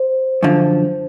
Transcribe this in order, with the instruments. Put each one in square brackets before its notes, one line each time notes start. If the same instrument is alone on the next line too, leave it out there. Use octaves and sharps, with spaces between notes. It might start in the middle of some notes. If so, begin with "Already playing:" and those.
Already playing: [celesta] C5
[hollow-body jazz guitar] F#2 D3 F3